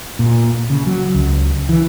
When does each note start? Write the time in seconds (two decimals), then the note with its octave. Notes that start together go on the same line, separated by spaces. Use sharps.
0.19 A#2
0.70 C#3
0.87 F#3
1.15 C#2
1.69 E3